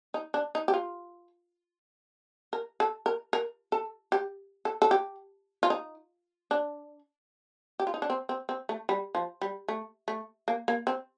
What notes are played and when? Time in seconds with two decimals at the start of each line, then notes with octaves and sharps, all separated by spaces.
0.14 D#4
0.34 D4
0.55 D#4
0.68 G4
0.74 F4
2.53 A#4
2.80 A4
3.06 A#4
3.33 A#4
3.72 A4
4.12 G4
4.65 A4
4.82 A4
4.91 G4
5.63 F4
5.70 D#4
6.51 D4
7.80 G4
7.87 F4
7.94 D#4
8.02 D4
8.10 C4
8.29 C4
8.49 C4
8.69 A3
8.89 G3
9.15 F3
9.42 G3
9.68 A3
10.08 A3
10.48 A#3
10.68 A#3
10.87 C4